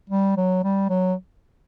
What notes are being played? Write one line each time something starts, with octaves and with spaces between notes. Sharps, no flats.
G3
F#3
G3
F#3